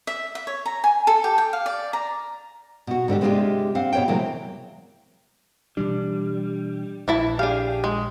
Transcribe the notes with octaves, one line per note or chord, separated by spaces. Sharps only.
E5
E5
C#5
A#5
G#5
A4
G4
G5
F5
D5
A#5
B2 F#4
G#2 D3 D4 G4
C3 G#3 D4 D#4 F4 G4
C4 F5 F#5
B2 C#5 G5
C3 E3 F#3 G#3 A#3
B2 E3 G3 D4
A#1 E3 E4 A5
D4 G4 G#4 F5
G#3